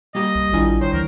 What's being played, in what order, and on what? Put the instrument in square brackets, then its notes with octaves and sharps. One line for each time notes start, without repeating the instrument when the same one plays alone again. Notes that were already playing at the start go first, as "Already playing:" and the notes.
[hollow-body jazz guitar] G3 A#3 G4 [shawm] D#5
[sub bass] C2
[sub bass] A1 [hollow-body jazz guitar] D#3 F4 G#5 [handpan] G3 D4 E4
[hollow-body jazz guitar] D#3 [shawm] C5 [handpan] C#5
[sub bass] C#2 [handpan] E3 [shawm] A#4